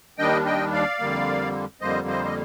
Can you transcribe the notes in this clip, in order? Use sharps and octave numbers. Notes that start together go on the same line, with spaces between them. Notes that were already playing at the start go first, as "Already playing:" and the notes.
D#2 D#3 G3 D4 D#5 G5
D#5 G5
D5 F5
F2 D3 G3 A#3
F2 D3 G3 A#3 C5 D#5
C5 D#5
D#5